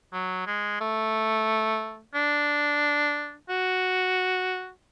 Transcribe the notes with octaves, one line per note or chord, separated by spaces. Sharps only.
F#3
G#3
A3
D4
F#4